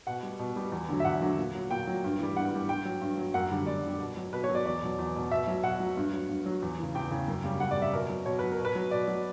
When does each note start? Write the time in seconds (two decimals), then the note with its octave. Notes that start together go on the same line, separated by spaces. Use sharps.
0.07 B2 F#5
0.23 G3
0.39 B2
0.56 G3
0.72 E2
0.89 D3 F#3
1.00 E5
1.05 E2 F#5
1.22 D3 F#3
1.38 A#2
1.55 F#3
1.71 A#2 G5
1.87 F#3
2.04 G2
2.19 E3 G3
2.36 G2 F#5
2.52 E3 G3
2.69 G2 G5
2.85 F#3
3.01 G2
3.18 F#3
3.34 F#2 F#5
3.51 D3 G3
3.67 F#2 D5
3.84 D3 G3
4.00 B2
4.17 F#3
4.33 B2 B4
4.44 C#5
4.49 F#3
4.55 D5
4.66 E2 D5
4.82 B2 F#3
4.99 E2
5.15 B2 F#3
5.31 B2 E5
5.47 F#3
5.63 B2 F#5
5.80 F#3
5.97 G2
6.13 F#3
6.29 G2
6.46 F#3
6.62 E2
6.79 C#3 E3
6.95 E2 G5
7.11 C#3 E3
7.28 F#2
7.44 C#3 G3
7.60 F#2 F#5
7.71 D5
7.77 C#3 G3 E5
7.93 B2 A#4
8.09 F#3
8.25 B2 C#5
8.39 F#3 B4
8.52 A#4
8.59 B2
8.65 B4
8.75 F#3
8.91 B2 D5
9.08 F#3